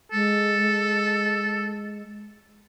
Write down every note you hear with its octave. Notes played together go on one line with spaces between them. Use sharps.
G#3 A4